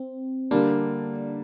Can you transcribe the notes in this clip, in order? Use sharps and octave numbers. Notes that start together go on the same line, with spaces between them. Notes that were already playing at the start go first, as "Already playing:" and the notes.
Already playing: C4
D3 G3 A#3 D4